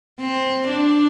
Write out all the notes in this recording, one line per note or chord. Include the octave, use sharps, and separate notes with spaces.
C4
D4